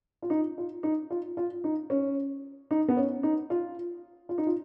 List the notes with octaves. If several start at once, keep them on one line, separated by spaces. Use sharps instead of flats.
F4
D#4
F4
D#4
F4
F4
D#4
C#4
D#4
B3
C#4
D#4
F4
F4
D#4
F4